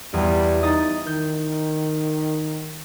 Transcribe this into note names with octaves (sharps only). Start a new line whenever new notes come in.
E2 G3
D#4 D#6 A6
D#3 G6